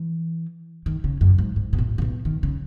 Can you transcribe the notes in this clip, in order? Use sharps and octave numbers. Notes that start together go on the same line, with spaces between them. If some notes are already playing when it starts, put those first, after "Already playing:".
Already playing: E3
D#3
C#3
F#2
G#2
G#2
B2
A2
C#3
B2
D#3
C#3